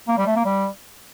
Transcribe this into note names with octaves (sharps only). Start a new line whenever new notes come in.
A#3
G3
A3
A#3
G3